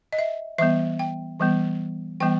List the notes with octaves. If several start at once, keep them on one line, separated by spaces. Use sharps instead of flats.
D#5
E5
E3 G3 B3 E5
G5
E3 G3 B3
E3 G3 B3 G5